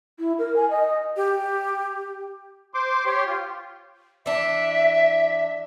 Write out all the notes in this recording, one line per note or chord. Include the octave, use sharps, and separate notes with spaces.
E4
A#4
G#5
D#5
G4
C5 C6 D6
G4 C#5 G5 C6
F4
E3 D4 E5